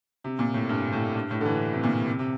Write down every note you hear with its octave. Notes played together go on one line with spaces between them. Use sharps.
C3
A#2
A2
G2
A2
G2
A2
D3
E3
C3
A#2
C3
C3